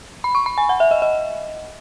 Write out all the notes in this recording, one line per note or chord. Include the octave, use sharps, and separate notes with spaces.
B5
C#6
B5
G#5
F#5
E5
D#5
D#5